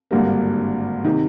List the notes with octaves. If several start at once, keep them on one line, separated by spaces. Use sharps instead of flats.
G#1 G2 D3 G3 A#3
C3 D#3